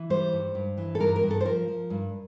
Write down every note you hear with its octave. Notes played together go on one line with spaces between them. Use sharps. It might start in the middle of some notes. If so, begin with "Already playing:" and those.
Already playing: E3
G3 C5
G2
G2
E3
A4
G2 A#4
A#4
G2
A4
C5
F3 A#4
F3
G2